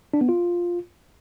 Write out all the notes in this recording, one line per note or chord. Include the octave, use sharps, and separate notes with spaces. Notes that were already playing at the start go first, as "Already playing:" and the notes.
D4
B3
F4